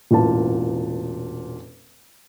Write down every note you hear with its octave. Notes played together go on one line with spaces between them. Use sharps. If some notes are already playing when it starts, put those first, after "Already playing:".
E1 A1 A#2 A5